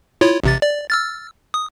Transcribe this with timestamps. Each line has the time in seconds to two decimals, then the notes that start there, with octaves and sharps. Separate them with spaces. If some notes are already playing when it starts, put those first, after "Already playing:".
0.21 E4 F4 C#5
0.43 A1 C3 A6
0.62 D5
0.90 E6 F6 A6
1.54 D#6